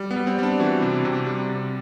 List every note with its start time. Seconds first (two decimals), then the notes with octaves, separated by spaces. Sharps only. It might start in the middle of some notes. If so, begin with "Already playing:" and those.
Already playing: G3
0.11 B3
0.16 G3
0.27 C4
0.39 G3 D4
0.60 E3 F#4
0.82 C3
1.05 C3
1.26 G3
1.49 C3